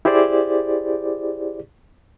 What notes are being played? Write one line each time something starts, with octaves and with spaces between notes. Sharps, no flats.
E4 G4 G#4 C5 D5